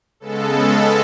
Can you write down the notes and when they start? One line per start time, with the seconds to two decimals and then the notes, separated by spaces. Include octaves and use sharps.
0.20 C#3 G#3 B3 A4